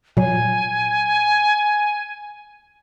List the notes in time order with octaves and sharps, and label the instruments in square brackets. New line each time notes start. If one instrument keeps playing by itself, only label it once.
[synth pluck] A#2 F#3 [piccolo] G#5